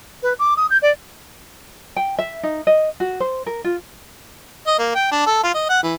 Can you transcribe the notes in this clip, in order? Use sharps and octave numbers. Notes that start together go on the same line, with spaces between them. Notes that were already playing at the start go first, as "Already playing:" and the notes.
B4
D6
D#6
G6
D5
G5
E5
D#4
D#5
F#4
C5
A#4
F4
D#5
A#3
G5
D4
A4
F4
D#5
F#5
E3